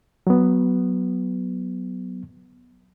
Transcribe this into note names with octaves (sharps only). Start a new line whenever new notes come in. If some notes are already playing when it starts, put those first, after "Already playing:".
F#3 B3